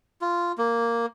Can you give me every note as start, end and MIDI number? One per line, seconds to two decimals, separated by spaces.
0.21 0.52 65
0.58 1.06 58